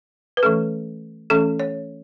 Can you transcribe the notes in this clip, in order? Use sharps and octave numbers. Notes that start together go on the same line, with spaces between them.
B4
E3 A3 C#4 A4
E3 A3 C#4 A4
C#5